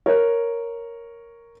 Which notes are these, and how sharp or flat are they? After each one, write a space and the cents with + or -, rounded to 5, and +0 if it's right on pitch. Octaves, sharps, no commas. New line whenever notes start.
A#4 +0 C#5 +0